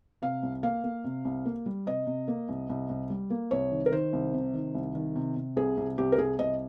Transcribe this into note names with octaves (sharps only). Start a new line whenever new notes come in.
C3 F5
C2
A#3 F5
A#3
C3
C2
A#3
G3
C3 D#5
C3
A#3
C2
C2
C2
G3
A#3
C2 C#5
D#3
A#4
D#3 C5
C2
C3
D#3
C2
D#3
C3
C3
C2 G#4
C2
C2 G4
A#4
C2 G#4
C2 D#5